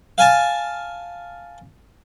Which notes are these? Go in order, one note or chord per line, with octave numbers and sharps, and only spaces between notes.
F5 G#5 A5